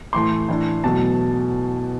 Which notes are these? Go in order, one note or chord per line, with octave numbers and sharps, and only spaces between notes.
A2 E3 A3 C6
A2 E3 A3 D4
E2 B2 F#3 A3 A5